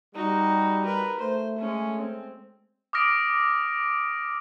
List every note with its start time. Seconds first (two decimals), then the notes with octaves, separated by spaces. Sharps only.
0.15 G3 D#4 F#4
0.85 A#4 B4
1.20 A3 C5
1.58 G#3 C#4
2.01 C4
2.93 D6 D#6 F6 A#6 D7